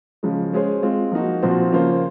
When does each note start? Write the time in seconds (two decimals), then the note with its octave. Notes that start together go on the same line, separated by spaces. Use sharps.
0.23 C#3 F3 G#3
0.53 G#3 C#4 G#4 C5
0.82 G#3 C4 F4
1.12 F3 A#3 D#4 F#4
1.42 A#2 F3 C4 F#4 C5
1.72 C#3 F3 A#3 F4 C5